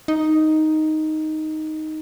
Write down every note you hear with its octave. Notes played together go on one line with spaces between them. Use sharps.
D#4